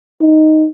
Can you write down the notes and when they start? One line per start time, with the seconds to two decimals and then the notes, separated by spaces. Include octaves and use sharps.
0.21 D#4